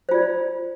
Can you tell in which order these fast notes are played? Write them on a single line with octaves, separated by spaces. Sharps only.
C5 F4 D5